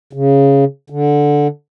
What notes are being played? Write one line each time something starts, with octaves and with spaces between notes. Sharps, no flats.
C#3
D3